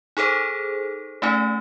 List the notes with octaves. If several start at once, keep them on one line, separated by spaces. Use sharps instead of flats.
D#4 G#4 A4 C5
A3 C#4 D#4